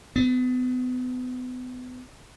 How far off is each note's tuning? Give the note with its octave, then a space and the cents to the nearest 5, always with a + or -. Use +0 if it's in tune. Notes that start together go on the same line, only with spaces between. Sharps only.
B3 +35